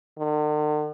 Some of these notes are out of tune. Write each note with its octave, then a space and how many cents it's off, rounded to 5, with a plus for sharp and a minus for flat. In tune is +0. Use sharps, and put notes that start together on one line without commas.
D3 +45